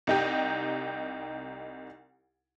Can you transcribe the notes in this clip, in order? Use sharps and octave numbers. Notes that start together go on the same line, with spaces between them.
C2 D#4 G4